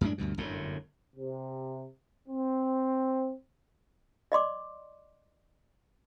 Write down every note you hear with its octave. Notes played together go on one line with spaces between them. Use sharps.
F#2 A2 G#3 D4
D2 G2 B2
G1 F#2 A2 D3
C3
C4
D5 D#5 C6 D6